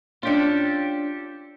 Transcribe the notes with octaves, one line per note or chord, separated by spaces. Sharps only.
C#4 D4 F4 G4 A4